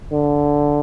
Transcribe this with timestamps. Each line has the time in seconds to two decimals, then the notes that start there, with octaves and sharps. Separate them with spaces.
0.12 D3